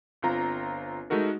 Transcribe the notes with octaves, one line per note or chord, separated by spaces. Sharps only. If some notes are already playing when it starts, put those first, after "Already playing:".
G1 C4 F4 A#5
G#3 A3 D#4 F#4 A#4